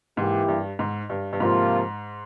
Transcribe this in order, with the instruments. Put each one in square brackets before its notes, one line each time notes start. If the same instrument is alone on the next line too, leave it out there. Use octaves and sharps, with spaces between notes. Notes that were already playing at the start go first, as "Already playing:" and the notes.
[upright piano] G#2 [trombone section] E3 A#3 E4 G4
[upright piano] G2
G#2
G2
G2
[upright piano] G#2 [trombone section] C3 F3 A#3 F4